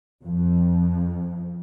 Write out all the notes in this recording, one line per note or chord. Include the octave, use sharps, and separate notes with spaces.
F2